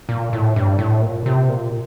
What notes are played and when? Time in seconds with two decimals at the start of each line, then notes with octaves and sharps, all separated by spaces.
0.09 A#2
0.33 A2
0.56 G2
0.79 A2
1.02 A#2
1.26 C3
1.49 A#2